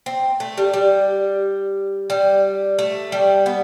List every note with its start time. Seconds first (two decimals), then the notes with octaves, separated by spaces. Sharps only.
0.06 C4
0.40 A3
0.58 G3
0.74 G3
2.10 G3
2.79 A3
3.12 G3
3.46 B3